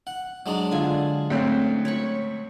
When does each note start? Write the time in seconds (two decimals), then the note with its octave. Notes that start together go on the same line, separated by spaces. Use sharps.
0.07 F#5
0.46 F#3 G#3 D4
0.71 D3 F4 G#5
1.30 D2 C4 C#4
1.85 C#5 B5 C#6